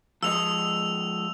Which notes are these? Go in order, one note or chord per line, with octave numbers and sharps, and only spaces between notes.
F3 G#3 D#5 E6 F7